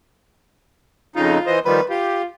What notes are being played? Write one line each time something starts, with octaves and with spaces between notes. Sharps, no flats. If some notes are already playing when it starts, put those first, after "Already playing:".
F2 C#3 D#4 F4
E3 C5 D#5
D#3 F3 G3 B4
F4 G4